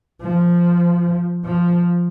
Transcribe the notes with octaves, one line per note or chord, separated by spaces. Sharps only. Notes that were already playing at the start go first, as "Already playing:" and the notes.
F3
F3